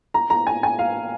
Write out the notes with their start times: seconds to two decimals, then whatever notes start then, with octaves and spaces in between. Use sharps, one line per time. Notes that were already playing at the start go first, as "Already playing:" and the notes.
0.14 A#5
0.30 A#5
0.47 G#5
0.63 G#5
0.79 F5